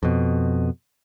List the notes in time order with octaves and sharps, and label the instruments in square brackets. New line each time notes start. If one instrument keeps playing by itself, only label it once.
[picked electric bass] F2 B2